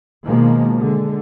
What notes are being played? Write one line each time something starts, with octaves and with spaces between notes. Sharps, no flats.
B2 D#3 F3 G#3 A#3
D3 G#3